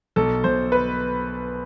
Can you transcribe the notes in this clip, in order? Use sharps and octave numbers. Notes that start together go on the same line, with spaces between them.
B1 A4
B1 C5
B4